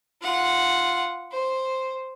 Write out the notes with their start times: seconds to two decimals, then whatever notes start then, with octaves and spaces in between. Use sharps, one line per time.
0.22 F4 F#5
1.31 C5